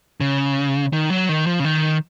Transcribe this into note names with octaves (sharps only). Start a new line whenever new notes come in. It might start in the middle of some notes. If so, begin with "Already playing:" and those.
C#3
D#3
F#3
D#3
F3
C#3
D#3